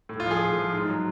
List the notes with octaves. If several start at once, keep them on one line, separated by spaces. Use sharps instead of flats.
A2
F4
F3 G#4
A2
F3
G#2
F#3